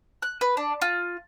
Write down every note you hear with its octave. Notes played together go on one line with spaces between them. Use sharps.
F#6
B4
D4
F4